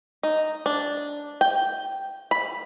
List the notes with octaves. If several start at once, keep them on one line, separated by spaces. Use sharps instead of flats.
D#4
D4
G5
B5